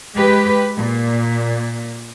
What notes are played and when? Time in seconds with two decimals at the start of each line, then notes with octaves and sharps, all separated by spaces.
0.15 G#3 G4 B4
0.76 A#2